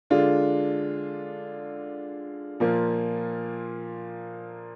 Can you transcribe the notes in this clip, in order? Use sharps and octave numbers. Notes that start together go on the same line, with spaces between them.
D3 G#3 D4 F4
A#2 F3 A#3